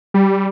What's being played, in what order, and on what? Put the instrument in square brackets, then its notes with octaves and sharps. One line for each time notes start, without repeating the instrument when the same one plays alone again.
[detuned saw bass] G3